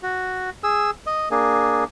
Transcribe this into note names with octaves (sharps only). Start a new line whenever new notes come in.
F#4
G#4 E6
D#5
A#3 D4 G#4